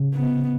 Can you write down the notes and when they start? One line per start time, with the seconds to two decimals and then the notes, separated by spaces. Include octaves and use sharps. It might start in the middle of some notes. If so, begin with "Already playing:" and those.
Already playing: C#3
0.14 B3